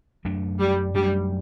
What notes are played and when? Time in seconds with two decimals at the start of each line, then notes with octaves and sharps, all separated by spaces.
0.25 F#2 F#3 A3 D4
0.59 G3
0.94 F#2 F#3 G3 A3 D4